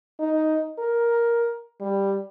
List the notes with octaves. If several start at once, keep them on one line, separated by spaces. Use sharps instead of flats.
D#4
A#4
G3